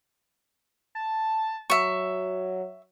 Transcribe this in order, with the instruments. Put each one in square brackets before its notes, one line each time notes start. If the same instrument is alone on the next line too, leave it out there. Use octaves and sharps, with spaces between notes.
[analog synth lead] A5
[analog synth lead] F#3 [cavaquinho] E5 C#6